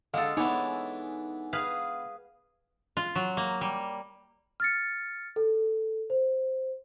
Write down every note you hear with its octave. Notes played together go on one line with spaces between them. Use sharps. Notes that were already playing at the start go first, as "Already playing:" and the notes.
D3 G#3 A4 F5
E3 B3 D4 D#4 C#5 G#5
G#4 B4 F5
F4
F#3
A#3
G3
F6 A6 C#7
A4
C5